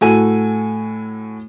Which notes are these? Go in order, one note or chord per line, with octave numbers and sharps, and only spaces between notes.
A2 F#4 A4 G#5 D#7